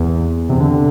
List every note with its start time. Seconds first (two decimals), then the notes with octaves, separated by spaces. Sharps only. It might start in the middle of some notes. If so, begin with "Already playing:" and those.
Already playing: E2
0.50 C3
0.60 D3